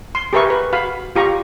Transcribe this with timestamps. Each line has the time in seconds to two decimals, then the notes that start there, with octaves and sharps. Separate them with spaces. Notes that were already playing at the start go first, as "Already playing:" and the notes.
0.15 C6
0.33 G4 G#4 A#4 B4 E5 C#6
0.50 B4
0.73 F#4 F5 B5
1.16 F4 G4 A#5 C#6